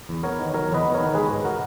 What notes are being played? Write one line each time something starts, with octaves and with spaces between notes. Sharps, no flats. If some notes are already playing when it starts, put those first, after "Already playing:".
E2
B3 A#4 C#5
D#3
F#3 A#4 C#5
E2
B4 D#5
B3
A#4 C#5
D#3
G#3 G#4 B4
G#2
F#4 A#4